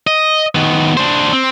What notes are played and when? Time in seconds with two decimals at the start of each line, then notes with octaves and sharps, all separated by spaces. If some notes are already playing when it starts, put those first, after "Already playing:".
0.07 D#5
0.55 D#3 B3
0.97 D4 C5
1.32 C4